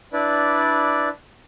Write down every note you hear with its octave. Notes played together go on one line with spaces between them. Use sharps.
D4 E4 B4 D5